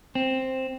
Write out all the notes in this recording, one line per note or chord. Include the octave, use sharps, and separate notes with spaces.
C4